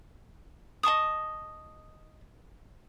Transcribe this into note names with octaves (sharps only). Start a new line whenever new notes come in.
D#5 A5 C#6 D#6